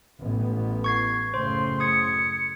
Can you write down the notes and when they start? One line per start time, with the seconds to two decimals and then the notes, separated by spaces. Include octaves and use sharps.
0.19 A1 B3
0.84 C#6 G#6 C7
1.34 F#2 A2 C#3 C5 C6
1.80 D#6 G#6 C#7